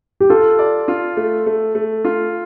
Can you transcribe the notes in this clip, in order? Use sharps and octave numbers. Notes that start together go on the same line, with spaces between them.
G4
F4 A4
D5
F4
A3
A3
A3
F4